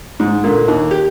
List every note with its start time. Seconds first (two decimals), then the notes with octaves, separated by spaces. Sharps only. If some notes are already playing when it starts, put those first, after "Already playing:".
0.20 G#2
0.44 A#2 D3
0.68 D#2
0.91 G4